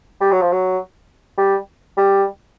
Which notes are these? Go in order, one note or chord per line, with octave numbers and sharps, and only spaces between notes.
G3
F#3
F3
F#3
G3
G3